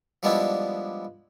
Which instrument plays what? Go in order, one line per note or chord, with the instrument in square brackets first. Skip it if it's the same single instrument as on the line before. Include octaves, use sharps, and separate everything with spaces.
[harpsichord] F3 G3 G#3 B3 D4 E4